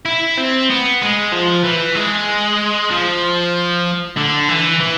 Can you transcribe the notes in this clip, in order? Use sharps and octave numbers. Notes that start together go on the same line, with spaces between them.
E4
C4
B3
G#3
F3
E3
G#3
F3
D3
E3
E3